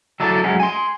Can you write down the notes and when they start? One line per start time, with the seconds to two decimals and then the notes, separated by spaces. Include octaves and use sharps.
0.20 F#3 E4 A4 D5
0.44 F#3 G#3 A3 C#4
0.60 G#5 C6